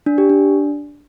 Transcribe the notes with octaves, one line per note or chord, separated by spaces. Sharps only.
D4
G4
D4